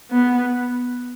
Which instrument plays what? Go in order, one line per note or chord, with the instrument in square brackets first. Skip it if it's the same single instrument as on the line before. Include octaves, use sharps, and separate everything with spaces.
[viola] B3